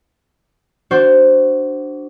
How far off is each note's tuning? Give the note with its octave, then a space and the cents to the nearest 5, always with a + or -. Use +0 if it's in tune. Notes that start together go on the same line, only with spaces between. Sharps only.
D4 +0 F#4 +20 C5 +0